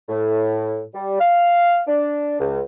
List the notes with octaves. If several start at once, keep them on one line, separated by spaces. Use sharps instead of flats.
A2
G3
F5
D4
C#2